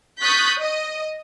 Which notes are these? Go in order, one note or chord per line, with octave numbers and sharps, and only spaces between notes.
C#6 D#6 F#6 G6 A6 B6
D#5